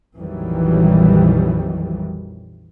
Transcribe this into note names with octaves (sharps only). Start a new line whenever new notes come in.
A#1 F2 D#3 E3 F#3 G3